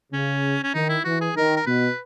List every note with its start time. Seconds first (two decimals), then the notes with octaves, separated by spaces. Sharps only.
0.12 C#3 C#4
0.64 C#4
0.74 D#3 D#4
0.89 E4
1.05 E3 F#4
1.21 G#4
1.36 D#3 A#4
1.56 A#4
1.66 B2 B4